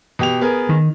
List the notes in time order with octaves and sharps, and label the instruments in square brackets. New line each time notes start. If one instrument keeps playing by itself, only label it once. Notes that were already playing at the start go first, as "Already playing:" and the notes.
[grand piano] B2 G4 F7
B3 G#4 A#4
[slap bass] D#3